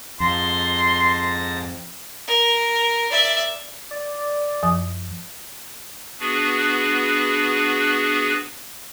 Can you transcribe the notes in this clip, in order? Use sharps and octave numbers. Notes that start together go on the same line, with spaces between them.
F2 G#2 A5 C6 A#6
A#4
D5 E5
D5
F#2 F3 D#6
B3 D4 F#4 G#4 B4